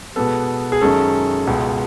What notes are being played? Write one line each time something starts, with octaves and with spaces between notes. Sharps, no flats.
B2 G#3 B3 A4
G#4
F#2 D#3 G#3 C#4 A4
C#2 B2 G#3